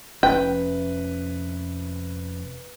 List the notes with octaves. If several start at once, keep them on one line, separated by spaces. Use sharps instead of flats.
F1 F2 C#4 B4 G5